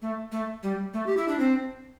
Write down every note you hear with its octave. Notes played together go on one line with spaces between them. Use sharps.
A3
A3
G3
A3
G4
E4
D4
C4